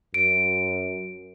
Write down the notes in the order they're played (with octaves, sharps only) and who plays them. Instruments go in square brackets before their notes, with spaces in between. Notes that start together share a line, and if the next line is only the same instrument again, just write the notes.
[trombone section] F#2 [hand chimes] D7